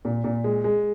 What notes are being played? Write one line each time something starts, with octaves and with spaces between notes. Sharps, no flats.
A#2
A#2
G#3
G#3